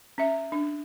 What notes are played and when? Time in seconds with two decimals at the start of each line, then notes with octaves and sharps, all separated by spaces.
0.18 C#4 E5
0.52 D4